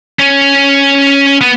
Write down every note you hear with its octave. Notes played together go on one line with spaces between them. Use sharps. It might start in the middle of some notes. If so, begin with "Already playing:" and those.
C#4
B3